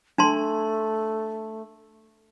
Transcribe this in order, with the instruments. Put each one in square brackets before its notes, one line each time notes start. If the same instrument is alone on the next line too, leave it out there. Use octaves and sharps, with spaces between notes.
[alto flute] A3 [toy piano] D4 A5 C6